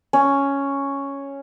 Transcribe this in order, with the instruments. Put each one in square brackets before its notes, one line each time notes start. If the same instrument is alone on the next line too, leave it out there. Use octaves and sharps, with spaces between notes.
[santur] C#4